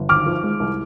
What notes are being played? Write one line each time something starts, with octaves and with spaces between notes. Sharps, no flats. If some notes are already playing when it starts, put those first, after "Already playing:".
Already playing: G1
G#1 D6 F6
F3
G#3
C2